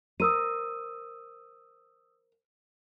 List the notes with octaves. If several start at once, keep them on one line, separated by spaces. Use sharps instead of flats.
A#4 C5 D#6 E6 D#7